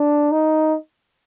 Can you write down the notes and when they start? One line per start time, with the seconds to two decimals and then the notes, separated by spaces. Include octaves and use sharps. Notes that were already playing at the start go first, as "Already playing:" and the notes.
Already playing: D4
0.31 D#4